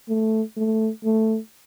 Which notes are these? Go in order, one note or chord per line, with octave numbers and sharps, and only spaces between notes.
A3
A3
A3